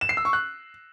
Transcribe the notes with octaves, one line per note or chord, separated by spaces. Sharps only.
E7
C7
E6
C#6
F#6